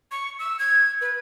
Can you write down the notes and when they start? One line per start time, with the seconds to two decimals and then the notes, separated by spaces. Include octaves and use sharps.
0.11 C#6
0.39 E6
0.59 G#6
1.01 B4